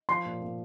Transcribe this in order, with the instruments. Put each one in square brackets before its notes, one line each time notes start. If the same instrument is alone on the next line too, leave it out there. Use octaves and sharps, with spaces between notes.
[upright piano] F3 [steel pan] C6
[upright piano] A#2
A#2